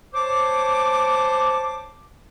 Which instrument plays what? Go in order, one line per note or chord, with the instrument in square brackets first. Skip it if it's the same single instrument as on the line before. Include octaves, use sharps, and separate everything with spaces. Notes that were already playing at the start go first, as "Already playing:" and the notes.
[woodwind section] C5 C#5 A5 D6